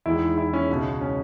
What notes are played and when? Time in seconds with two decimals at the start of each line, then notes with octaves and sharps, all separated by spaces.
0.06 E2 D#3 G#3 E4
0.38 E4
0.53 C#4
0.69 C#2 B2 G#3
1.01 C#4